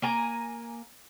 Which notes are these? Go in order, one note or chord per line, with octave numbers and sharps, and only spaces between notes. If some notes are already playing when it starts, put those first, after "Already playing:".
A#3 G#5 A#5